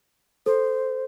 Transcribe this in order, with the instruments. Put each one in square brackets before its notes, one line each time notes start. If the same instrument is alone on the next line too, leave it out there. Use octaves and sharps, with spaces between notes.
[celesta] A4 [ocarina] C5